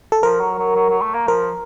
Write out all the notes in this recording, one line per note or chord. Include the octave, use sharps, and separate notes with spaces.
A4
F3 A#4
F#3
F#3
F#3
F#3
A3
A#3
F3 A#4